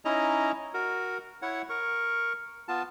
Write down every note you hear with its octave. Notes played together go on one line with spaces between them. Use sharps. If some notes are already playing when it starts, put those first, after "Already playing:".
C#4 D#4 E4 D#5 A#5
F#4 A#4
E4 C#5 F#5
A#4 C#6
B3 F4 A5